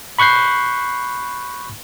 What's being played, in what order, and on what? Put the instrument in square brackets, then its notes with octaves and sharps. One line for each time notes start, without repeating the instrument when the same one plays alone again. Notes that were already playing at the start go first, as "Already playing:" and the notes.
[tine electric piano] B5 C#6 F#6 G6 C7